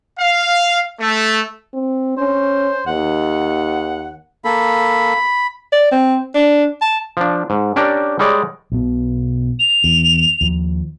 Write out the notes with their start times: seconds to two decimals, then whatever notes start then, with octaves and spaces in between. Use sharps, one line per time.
0.19 F5
0.99 A3
1.74 C4
2.18 C#4 C5
2.87 D#2 F#5
4.45 A#3 A4 B5
5.72 D5
5.91 C4
6.35 D4
6.81 A5
7.17 F3 D4
7.50 G#2
7.76 C#4 D4 G4 A#4 D5
8.19 G3 G#3 C#5 D5
8.72 B1 B2
9.59 F7
9.84 E2
10.41 D#2 F3